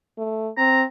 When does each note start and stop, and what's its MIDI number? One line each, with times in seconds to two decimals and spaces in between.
0.18 0.50 57
0.58 0.84 60
0.58 0.82 82